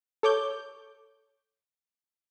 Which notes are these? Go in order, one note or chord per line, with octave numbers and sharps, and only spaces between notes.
A4 C#5 D6 G6